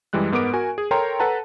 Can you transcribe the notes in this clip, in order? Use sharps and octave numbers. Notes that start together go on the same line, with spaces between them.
F#2 E3 G3 G#3 F#6
G#2 B3 A#4 D6 D7
F#4 A#4 G#5
G#4
A4 A#4 C#5 G5 A#5 C6
A4 B4 F#5 A5 A#5